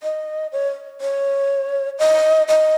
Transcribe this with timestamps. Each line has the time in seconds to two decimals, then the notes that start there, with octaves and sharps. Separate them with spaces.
0.03 D#5
0.52 C#5
1.01 C#5
1.99 D#5
2.48 D#5